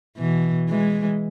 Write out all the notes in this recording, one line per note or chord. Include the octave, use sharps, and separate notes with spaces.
B2 E3
E3 G#3